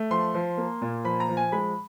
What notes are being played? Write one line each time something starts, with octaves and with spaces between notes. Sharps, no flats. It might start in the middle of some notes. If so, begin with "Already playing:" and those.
Already playing: A3
F3 C6
F3
A#3
A#2
F3 B5
A#5
F3
G#5
G#3 B5